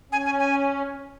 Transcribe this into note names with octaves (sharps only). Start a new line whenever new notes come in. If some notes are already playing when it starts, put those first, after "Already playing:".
C#4 G#5
G#5
G#5